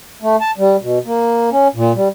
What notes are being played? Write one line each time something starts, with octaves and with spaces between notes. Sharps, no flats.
A3
A5
G3
B2
A#3
C#4
A#2
G3